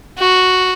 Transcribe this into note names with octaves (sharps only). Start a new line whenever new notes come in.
F#4